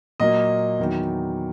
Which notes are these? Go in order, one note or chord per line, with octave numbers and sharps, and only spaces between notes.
A#2 F#3 A#3 D#5
E2 D#3 F#3